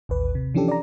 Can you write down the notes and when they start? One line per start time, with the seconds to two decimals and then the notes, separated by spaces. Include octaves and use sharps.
0.09 A1 D#2 B4
0.35 C3
0.54 E3 F3 C#4 D4 G4 A4
0.68 D5 A#5